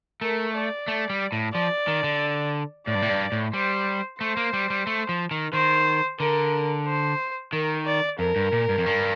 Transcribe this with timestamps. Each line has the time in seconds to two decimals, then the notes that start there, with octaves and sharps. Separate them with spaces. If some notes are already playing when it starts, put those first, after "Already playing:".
0.21 A3 A#4
0.55 D5
0.88 A3
1.10 G3
1.32 A2
1.54 F3 D5
1.88 D#3
2.04 D3
2.87 A2 D5
2.95 G2
3.02 A2
3.09 G2
3.32 A2
3.53 G3 C5
4.21 A3 C5
4.37 A#3
4.53 G3
4.70 G3
4.87 A3
5.09 F3
5.31 D#3
5.53 D#3 C5
6.20 D3 A#4
6.86 C5
7.53 D#3 A#4
7.86 D5
8.19 F2 A#4
8.36 G2
8.52 A#2
8.69 G2
8.78 F2
8.86 G2